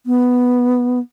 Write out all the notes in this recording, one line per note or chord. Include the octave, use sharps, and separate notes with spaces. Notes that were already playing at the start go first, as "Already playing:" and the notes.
B3